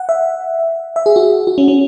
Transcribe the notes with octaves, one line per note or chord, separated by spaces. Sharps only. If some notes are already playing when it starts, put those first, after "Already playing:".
Already playing: F#5
E5
E5
G#4
F#4
F#4
C#4
C#4